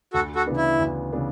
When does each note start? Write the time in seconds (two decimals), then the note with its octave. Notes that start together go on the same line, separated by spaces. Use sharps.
0.13 D2 F#4 A4
0.35 F#4 A4
0.46 C#3 E3 B3 D4
0.57 E4
0.79 D2
1.12 C#3 E3 B3 D4